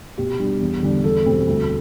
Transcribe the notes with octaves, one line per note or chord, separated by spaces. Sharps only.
B2 G4
G3 D4
E2
D3 G3 D4
E2 A4
B2 G3 C4
D2